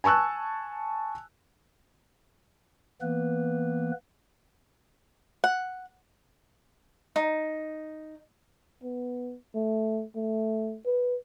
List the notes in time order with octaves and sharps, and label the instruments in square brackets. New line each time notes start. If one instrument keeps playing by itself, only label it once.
[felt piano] G#5 A5 C#6 E6 F#6
[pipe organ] E3 A#3 B3 B4
[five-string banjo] F#5
[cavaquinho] D#4
[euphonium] B3
A3
A3
B4